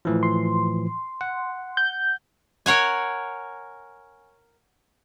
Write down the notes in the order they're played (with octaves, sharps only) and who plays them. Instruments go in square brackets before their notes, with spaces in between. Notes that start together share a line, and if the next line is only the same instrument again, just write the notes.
[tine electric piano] A2 E3 F3
[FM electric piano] C6
[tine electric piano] F#5
[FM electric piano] G6
[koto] A#4 C#5 F#5 G#5